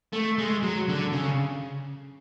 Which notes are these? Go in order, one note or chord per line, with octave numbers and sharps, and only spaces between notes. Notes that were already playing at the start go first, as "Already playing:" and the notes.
A3
G#3
F#3
D3
C#3